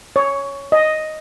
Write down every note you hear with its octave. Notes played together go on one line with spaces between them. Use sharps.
C#5
D#5